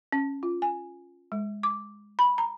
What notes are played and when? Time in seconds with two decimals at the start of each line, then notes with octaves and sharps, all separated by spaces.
0.12 C#4
0.43 F4
0.62 G#5
1.32 G#3
1.63 D6
2.19 B5
2.38 A#5